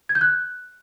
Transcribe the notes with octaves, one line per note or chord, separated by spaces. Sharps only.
G#6
G6
F#6